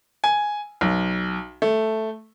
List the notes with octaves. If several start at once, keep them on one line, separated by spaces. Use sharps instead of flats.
G#5
B1
A3